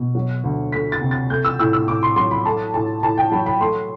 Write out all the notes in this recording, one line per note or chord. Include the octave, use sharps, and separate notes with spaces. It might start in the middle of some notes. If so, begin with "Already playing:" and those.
Already playing: B2
F#3
D2
A3 B6
A6
C3
A6
A3 G6
E6
A2 E6
E6
A2 D6
C6
F#3 C6
B5
A3 A5
A2 A5
A2 A5
G5
F#3 B5
B5
A3 C6